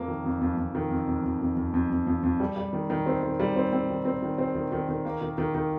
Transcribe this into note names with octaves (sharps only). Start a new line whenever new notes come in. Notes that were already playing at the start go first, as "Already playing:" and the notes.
Already playing: F2 A#3
D#3
F2
F2
F2
D#3
F2
F2
F2
F2
F2
F2
F2
F2
F2
G3
G3
D#3
D#3
C4
D#3
G3
C4
C4
D#3
C4
D#3
C4
D#3
D#3
D#3
A#3
D#3
D#3
D#3